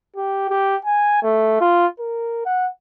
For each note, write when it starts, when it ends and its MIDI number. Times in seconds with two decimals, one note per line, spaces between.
0.17 0.45 67
0.50 0.76 67
0.85 1.22 80
1.22 1.58 57
1.61 1.87 65
1.99 2.44 70
2.46 2.68 78